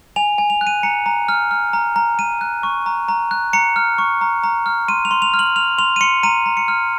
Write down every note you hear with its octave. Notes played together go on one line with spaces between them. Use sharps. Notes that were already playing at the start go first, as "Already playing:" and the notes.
G#5 F7
G#5
F7
F#6
D#7
A#5 C#7
A#5
F6
F6
A#5
A#5
A#5 D#7
F#6
C#6
A#5
A#5
F#6
A#5 C#7
F6
C#6
A#5
A#5
F6
C6 D#7
F7
C6
F7
F6
F#7
F6 F7
C6 F7
D#7
C6 C#7
A#5 D#7
A#5
C#7
F6